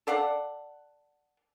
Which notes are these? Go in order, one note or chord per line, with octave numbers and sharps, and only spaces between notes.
A4 D5 F5 F#5